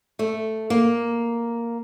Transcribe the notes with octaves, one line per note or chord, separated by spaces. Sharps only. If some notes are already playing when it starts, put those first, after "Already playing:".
A3
A#3